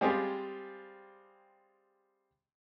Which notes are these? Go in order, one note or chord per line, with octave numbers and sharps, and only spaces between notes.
G3 G#3 C4 F4 G4 G#4